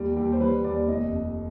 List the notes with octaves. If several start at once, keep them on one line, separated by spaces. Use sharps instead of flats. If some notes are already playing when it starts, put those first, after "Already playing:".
Already playing: D#2 G3
D#2 G4
C5
G3 B4
D#2 D5
F1 D#5
F2